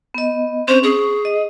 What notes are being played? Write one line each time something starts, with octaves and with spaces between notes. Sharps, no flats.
B3 D#5
C4 C#4 C5
G#4 C#6
D#5